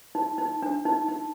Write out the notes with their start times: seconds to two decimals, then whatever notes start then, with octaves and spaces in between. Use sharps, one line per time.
0.15 D#4
0.38 D#4
0.62 D4
0.85 D#4
1.08 D#4